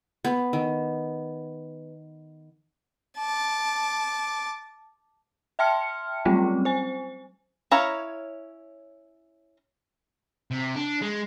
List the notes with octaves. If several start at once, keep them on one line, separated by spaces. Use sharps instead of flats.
B3
D#3
A5 D6
E5 G5 A5 C6 F6 C#7
F#3 G3 A3 C4 C#4 F4
C5 G#5
C#4 E4 C#5 F5 A#5
C3
D4
G#3